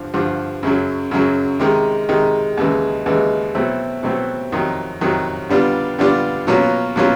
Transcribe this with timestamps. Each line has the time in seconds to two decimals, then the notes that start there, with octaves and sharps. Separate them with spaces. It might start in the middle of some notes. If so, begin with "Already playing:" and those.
Already playing: G2 D3 F3
0.14 G2 D3 F3
0.63 F#2 C#3 F#3
1.11 F#2 C#3 F#3
1.60 C3 D#3 G#3
2.09 C3 D#3 G#3
2.57 D#2 C#3 E3 G#3
3.06 D#2 C#3 E3 G#3
3.55 B2 F#3 A3 C4 E4
4.03 B2 F#3 A3 C4 E4
4.52 F2 C3 D#3 F#3
5.01 F2 C3 D#3 F#3
5.49 D3 G3 B3 D4 F4
5.99 D3 G3 B3 D4 F4
6.47 B2 F#3 A#3 C#4 F4
6.96 B2 F#3 A#3 C#4 F4